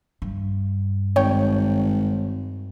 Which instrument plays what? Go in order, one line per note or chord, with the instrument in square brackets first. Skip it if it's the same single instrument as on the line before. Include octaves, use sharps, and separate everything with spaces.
[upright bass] G2
[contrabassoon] G#1 [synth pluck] C#5 G5